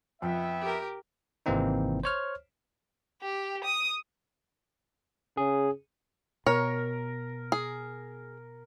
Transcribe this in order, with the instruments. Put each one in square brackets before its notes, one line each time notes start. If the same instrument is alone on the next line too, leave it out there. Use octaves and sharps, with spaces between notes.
[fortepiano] F2 [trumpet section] B3 E5 [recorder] G5
[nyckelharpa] G4 A#4
[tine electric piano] G#1 C3 E3 A#3 C4 D#4
C5 C#5 F6
[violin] G4
D#6
[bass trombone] C#3 [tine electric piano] G#4
[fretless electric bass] B2 [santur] A#4 [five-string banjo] C#5
[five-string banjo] G#4